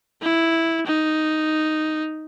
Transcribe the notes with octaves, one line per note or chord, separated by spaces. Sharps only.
E4
D#4